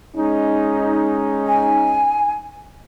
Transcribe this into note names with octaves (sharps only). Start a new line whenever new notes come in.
G#3 C#4 D#4
G#5